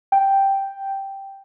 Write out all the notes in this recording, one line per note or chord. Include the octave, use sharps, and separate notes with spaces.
G5